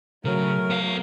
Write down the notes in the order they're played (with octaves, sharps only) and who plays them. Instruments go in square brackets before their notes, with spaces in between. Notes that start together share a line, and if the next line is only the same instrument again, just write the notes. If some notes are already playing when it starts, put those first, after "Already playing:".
[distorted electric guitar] C#3 [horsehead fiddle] F#3 A3 [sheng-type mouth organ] A#4
[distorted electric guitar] B3 F5